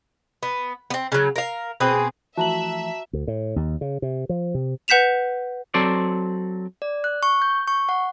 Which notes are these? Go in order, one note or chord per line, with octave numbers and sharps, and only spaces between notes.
B3
B3 C4
C#3 F#3
A#4 F5
B2 C4 G#4
E3 F3 A3 F#4 E5 A5 A#5 F#7
D2
A2
D#2
C#3
C3
F3
C3
B4 F#5 G6 B6 E7 F7
F#3 C4 A4 C5 D5
D5
F#6
C#6
G6
C#6
F#5